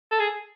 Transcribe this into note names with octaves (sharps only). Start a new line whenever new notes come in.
A4
G#4